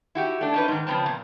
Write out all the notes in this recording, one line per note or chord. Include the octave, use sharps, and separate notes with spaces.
E4 F#4 G4
A3 D4
C#4 D#4 B4
G#2 D#3
C#3 F3 B3 C4 A5
A#2